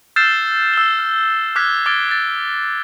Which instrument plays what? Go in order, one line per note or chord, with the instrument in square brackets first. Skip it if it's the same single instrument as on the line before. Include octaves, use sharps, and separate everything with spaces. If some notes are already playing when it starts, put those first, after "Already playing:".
[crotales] E6 F6 G6 A6 C7 E7
E6 G7
F6
D6 F6 F#6 G#6 B6
D6 F6 G#6 A6 D7 G7
A6